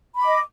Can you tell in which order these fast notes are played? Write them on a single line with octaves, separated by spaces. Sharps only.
B5 D6 D#5